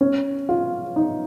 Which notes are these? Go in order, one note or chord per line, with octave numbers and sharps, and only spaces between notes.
C#4
F4
D#4